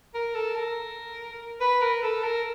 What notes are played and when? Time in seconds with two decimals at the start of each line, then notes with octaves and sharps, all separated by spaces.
0.14 A#4
0.35 A4
0.55 A#4
1.61 B4
1.82 A#4
2.03 A4
2.24 A#4